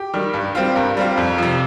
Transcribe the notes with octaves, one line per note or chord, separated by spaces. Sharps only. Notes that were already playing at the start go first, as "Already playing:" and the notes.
Already playing: G4
D#3 G3
G2
G3 C4 F4
G2 A#4
G3 C4 F4
F2
C3 F3